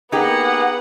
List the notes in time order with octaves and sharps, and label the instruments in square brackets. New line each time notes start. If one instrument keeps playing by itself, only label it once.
[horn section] A#3 G#4 [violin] B3 F#5 [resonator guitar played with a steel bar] D#4 G4